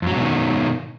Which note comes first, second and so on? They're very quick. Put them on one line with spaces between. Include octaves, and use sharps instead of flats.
F2 F#3 G#2 B2 D#3